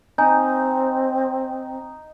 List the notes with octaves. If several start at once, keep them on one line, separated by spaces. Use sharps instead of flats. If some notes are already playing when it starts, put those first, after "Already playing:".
C4 D#4 G#5 A#5 G6